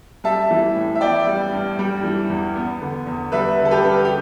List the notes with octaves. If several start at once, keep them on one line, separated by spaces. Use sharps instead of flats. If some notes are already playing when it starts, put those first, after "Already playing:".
G3 E5 A5
E3
A2
E5
B3 D5 G5
G3
G2
G3
E3
E2
B3
D3
E2
G3 B4 E5
D3
A4
G4 B4
G2
G4